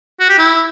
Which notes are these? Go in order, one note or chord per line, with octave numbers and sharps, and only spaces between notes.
F#4
G4
E4